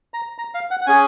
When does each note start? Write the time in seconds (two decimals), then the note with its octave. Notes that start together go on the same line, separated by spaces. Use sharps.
0.14 A#5
0.38 A#5
0.54 F5
0.71 F#5
0.81 F#5
0.86 C#4 G#4 G#5